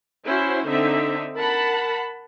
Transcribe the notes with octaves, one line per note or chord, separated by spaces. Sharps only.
C#4 E4 F#4 C5
D3 C4 D#4 E5
A#4 F#5 A5 B5